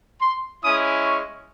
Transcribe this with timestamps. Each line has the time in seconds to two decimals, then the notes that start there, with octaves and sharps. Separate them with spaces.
0.22 C6
0.63 G#3 C#4 E4 D#6
1.06 C#6